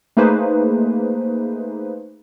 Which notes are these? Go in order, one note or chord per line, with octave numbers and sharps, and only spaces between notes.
A3 A#3 D#4 G#4 B4 C5